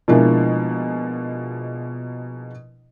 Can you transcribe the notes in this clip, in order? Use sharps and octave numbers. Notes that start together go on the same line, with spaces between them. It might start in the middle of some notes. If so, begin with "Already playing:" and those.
B2 F3 G#3 A#3 D4 E4